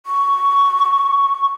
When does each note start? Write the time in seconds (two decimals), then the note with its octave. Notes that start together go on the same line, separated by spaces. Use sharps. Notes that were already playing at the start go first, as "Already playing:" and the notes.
0.06 C#6